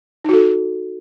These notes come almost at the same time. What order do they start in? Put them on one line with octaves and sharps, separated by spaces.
D#4 F#4 A4